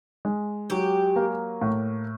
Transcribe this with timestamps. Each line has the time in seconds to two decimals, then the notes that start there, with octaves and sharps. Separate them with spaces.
0.25 G#3
0.70 F#3 G4
1.16 A#3
1.61 A2